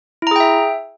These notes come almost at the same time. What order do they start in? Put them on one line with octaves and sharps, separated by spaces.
E4 A#5 G#4 G5 E5